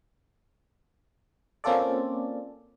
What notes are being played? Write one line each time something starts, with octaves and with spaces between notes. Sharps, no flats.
A#3 C4 C#4 F4 A4 D5